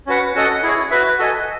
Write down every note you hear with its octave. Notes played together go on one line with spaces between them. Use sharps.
C#4 F#4 B4 F#5
C#4 F#4 A4 D#5 F#5
E4 G#4 C#5
F#4 B4 E5
F#4 A4 D#5 G#5